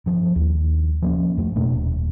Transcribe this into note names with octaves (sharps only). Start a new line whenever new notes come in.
G2 F3
D#2
F3 A#3 C#4
F2 A3
B2 A3 A#3 D4
D#1